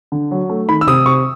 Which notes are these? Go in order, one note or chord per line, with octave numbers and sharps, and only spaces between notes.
D3
F#3
A3
D#3 B5
E6
C3 D#6
C3 C#6